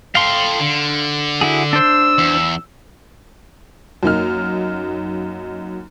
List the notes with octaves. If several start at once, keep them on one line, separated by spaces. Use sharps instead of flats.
A4 F5 G5 C6
D3
E4 F#4 G#4
D4 C5 E6
E2
F#2 A#3 D#4 F6